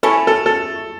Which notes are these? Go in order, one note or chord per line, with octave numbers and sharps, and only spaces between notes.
A3 C#4 E4 A4
A4
A4